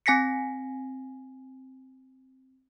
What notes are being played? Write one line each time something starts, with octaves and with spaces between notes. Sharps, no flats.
C4 G#5 A#6 B6 C#7